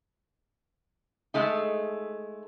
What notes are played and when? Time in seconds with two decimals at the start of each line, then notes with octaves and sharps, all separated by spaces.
1.34 G#3 A3 D#4